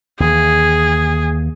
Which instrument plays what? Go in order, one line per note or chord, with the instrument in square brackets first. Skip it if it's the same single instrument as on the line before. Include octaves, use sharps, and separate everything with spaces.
[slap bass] D#2 E3 [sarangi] G#4